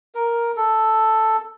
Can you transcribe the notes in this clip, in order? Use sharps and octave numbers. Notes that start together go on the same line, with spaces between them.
A#4
A4